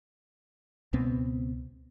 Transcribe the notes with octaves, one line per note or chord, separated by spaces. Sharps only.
C#2 B2 B3 C4